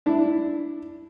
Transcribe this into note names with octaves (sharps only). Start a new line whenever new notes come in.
D4 E4